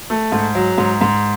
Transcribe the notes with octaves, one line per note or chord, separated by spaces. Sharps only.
A3
G#2
F#3
G#2
G#2